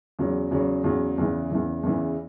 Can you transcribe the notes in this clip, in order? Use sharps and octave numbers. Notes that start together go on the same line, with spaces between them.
E2 C#3 F#3
E2 C#3 F#3
E2 C#3 F#3
E2 C#3 E3
E2 C#3 E3
E2 C#3 E3